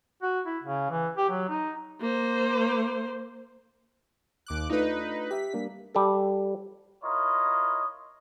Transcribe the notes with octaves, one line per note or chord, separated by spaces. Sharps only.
F#4
E4
C#3
E3
G4
F#3
D#4
A#3 C5
D#2 D6 F#6
A3 D4 D#4 F4 B4
G4 E5 B6
G3 A#3 D4
G3 G4 A4
E4 F4 A#4 C#5 D#5